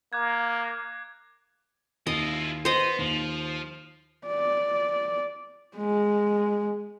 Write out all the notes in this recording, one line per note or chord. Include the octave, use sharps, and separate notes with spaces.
A#3 D6 F#6 G#6
D#2 E4 F4 D#5
B3 C5 D#5
D#2 F3
D5
G#3